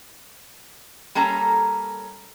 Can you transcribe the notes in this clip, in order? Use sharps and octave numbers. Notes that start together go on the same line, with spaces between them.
G3 A#3 C#4 A4 A#5